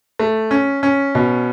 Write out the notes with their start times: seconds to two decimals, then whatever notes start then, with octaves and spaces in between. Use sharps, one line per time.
0.19 A3
0.51 C#4
0.83 C#4
1.15 B2